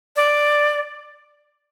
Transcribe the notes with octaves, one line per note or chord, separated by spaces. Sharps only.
D5